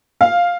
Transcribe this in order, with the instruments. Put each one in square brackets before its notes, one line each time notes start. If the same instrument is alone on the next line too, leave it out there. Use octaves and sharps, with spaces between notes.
[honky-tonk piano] F5